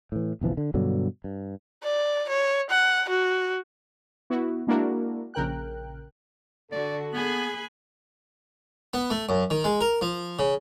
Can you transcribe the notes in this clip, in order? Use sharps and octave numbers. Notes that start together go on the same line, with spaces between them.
A2 E3
F#1 B1 E3 F3
D3
G2 B2 D3 F#3
G2
D5
C#5
F#5
F#4
B3 E4 F#4
G#3 A#3 D4 E4 F#4 A#4
A#1 C#3 A#4 G5 F#6
D3 F#4 A4 D5
A#3 B3 G#4 G#5 B5 F#6
B3
A3
F#2
D#3
G#3
A#4
F3
C#3